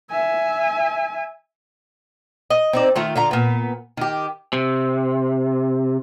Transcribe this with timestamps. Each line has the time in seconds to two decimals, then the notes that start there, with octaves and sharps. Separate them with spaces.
0.11 E5 G#5
2.50 D#5
2.73 C4 D#4 D5
2.96 D#3 A3 F4
3.16 D3 F4 A#5
3.31 A#2 B3
3.97 D#3 G4
4.53 C3